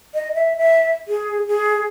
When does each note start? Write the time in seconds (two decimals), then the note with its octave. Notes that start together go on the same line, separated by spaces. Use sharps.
0.15 D#5
0.35 E5
0.58 E5
1.08 G#4
1.48 G#4